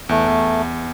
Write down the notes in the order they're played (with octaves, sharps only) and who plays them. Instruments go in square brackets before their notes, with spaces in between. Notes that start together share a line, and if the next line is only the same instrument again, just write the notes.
[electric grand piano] E2 [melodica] A3
[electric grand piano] E2